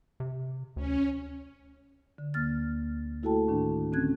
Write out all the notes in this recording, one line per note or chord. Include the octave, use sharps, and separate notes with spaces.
C3
D2 C#4
D3
D2 A#3 F6 A6
A3 E4 F#4 A4 G5 A5
A2 D#3 D4
D3 C4 C#4 F#6 G#6